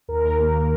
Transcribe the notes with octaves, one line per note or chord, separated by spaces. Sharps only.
D#2 A#4
D#2
A#3